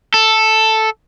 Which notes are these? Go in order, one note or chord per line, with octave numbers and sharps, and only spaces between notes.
A4